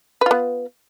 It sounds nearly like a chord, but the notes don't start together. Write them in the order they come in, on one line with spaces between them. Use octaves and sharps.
B4 F4 B3